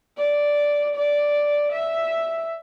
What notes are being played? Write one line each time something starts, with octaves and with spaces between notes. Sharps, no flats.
D5
D5
E5